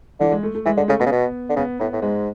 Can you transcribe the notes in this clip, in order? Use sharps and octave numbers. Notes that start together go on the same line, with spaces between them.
D3 E3
G#3
A3
A3
E3 G#3
D3 G#3
C#3 A3
B2 B3
C#3
B2
D3
C#3 B3
A2 B3
A2
G#2 G#3